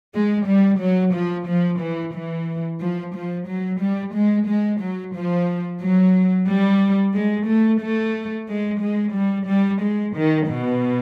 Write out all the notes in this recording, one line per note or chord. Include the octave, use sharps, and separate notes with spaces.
G#3
G3
F#3
F3
F3
E3
E3
F3
F3
F#3
G3
G#3
G#3
F#3
F3
F#3
G3
G#3
A3
A3
G#3
G#3
G3
G3
G#3
D#3
B2